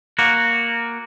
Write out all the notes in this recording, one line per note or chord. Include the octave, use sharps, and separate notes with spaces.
A#3 F#4